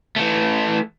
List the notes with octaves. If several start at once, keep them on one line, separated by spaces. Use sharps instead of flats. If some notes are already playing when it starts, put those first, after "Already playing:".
E3 A3